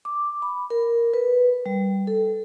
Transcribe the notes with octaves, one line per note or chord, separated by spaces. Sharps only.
D6
B5
A#4
B4
G3
A4